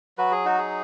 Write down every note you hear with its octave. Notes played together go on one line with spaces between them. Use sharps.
F#3 F#4 B4
G#4
D#4 F#4
G#4